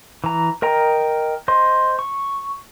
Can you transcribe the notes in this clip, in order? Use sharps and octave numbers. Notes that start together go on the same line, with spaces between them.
E3 A#5
A#4 D#5 G5 A#5
C5 D#5 C6
C#6